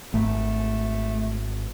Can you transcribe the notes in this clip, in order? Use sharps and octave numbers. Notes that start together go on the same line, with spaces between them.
G#1 A3